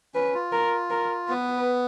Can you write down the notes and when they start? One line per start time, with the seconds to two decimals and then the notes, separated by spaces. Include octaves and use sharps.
0.14 C#4 B4
0.34 F4
0.52 A#4
0.91 A#4
1.29 B3 B4